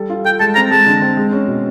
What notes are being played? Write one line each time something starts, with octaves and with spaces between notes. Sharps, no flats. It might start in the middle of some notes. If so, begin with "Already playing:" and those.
Already playing: G3 A4
F4
A4 G5
G#3 A5
C4 A#5
G#3 A5
D3
C4
G#3
C#4
B2